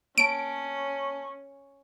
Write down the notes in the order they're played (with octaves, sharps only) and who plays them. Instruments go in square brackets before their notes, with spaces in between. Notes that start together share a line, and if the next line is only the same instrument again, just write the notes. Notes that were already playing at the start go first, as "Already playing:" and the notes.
[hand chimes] A#3 C#5 A5 [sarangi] C#4 [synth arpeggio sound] D7